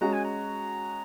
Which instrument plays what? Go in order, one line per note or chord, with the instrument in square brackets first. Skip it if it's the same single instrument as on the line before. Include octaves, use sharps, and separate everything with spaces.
[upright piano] G#3 C#4 F#4 [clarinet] A#5
[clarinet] G#5
A#5